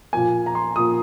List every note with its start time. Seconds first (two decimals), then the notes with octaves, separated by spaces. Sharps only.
0.13 A#2 F3 A#3 G#5
0.46 A#5
0.55 C6
0.76 A#2 F3 A#3 D#6